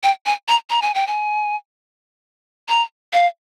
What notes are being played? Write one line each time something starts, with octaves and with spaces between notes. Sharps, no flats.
G5
G#5
A#5
A#5
G#5
G5
G#5
A#5
F5